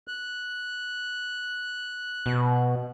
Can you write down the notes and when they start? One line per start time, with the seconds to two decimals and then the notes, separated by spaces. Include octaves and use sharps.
0.08 F#6
2.26 B2